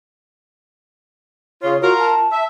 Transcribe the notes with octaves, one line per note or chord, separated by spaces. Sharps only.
C#3 F4 C#5
F4 F#4 A#4
A5
E5